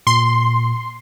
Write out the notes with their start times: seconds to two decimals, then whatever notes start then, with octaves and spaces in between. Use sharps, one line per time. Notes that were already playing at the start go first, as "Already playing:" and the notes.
0.07 A#2 C6